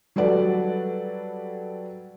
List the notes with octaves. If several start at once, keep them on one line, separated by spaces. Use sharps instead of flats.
F#3 G3 A4 B4 D5 F#5